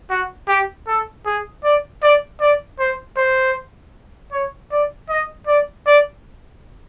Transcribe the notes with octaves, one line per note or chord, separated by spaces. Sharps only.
F#4
G4
A4
G#4
D5
D5
D5
C5
C5
C#5
D5
D#5
D5
D5